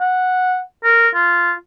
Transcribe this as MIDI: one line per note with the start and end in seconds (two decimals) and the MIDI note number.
0.01 0.58 78
0.84 1.08 70
1.14 1.52 65